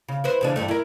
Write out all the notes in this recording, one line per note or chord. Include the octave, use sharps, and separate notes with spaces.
C#3
E4 B4 C5
E2 C#3 D4
E2 G2 A3
E4 A#4